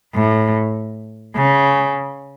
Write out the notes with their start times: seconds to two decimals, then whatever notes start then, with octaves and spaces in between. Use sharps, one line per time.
0.15 A2
1.36 C#3